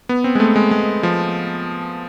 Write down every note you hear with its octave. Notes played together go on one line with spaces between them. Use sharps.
B3
C4
G#3
A3
G#3
G#3
F3